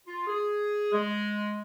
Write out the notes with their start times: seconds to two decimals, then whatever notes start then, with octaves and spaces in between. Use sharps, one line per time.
0.07 F4
0.27 G#4
0.92 G#3